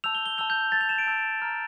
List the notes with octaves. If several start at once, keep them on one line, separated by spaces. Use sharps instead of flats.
A5 E6 G6 F7
G7
G7
A5 E6 G6 F7
G6
A5 E6 G6 A6
F7
E7
D7
A5 E6 G6
A#5 F6